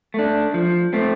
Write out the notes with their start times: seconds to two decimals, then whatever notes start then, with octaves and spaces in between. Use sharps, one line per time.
0.14 A3 D4
0.54 F3
0.93 A3 C4